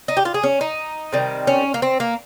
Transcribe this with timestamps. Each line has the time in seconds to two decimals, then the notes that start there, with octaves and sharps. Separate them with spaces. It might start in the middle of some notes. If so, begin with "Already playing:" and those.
0.08 D#4
0.17 G4
0.25 F4
0.34 G#4
0.43 C#4
0.61 D#4
1.13 C3 D#3 G3
1.47 C#4
1.74 A#3
1.82 C4
2.00 A#3